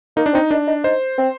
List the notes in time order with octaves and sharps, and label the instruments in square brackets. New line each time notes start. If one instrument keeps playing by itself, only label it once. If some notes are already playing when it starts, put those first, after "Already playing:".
[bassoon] A#3 [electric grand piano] D#4
[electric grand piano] D4
[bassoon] C4 [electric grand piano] D#4
[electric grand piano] D4 [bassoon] D#4
[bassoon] D#4
[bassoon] D#4 [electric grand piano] C5
[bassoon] C4